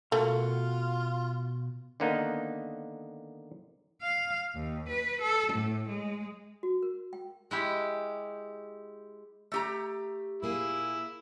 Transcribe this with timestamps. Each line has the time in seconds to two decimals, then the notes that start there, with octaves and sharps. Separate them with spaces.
0.12 B2 A3 A#3 F4 F#4
2.00 D3 D#3 A#3 B3 D#4
4.02 F5
4.55 D#2
4.89 B4
5.21 A4
5.52 A2
5.88 G#3
6.63 F#4
6.83 A#4
7.13 G5
7.51 G#3 E4 G4
9.52 A3 G4 A#5
10.43 A#2 A#3 E4 G#4